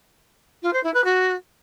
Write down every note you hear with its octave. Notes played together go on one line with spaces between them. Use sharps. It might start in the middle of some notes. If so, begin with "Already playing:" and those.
F4
C5
E4
B4
F#4